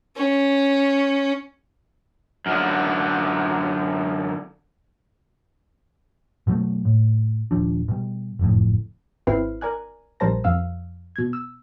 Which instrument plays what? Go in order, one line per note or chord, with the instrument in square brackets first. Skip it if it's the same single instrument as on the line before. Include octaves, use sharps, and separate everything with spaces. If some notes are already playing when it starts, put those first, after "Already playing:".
[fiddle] C#4
[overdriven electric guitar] F#2 D3
[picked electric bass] B2 F#3 G#3 A3
A2
D#1 D#2 F3 D4
B2 G3
F#1 F2 A2
[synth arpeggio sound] G#1 C4 E4 B4 F6 C7
A#4 D5 G#5 F#6
A#1 G3 A#4 C5 A5 A#6
F2 F5 E6
B2 G#6
E6